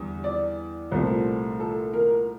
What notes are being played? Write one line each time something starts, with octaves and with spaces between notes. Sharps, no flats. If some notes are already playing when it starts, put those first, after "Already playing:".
Already playing: E2 D3 G3
D5
C2 A#2 F3 A3 C4
A4
A#4